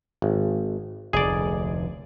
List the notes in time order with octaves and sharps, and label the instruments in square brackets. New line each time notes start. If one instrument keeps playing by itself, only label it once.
[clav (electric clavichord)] G#1
[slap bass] F1 D2 [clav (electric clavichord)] G#4 D5